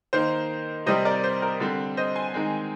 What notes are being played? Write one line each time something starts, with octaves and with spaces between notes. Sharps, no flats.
D#3 A#3 C5
C3 G3 C4 C5 D#5
A#4 D5
C5
A#4
D3 G3 C4
C5 D#5
G#5 C6
D#3 G#3 C4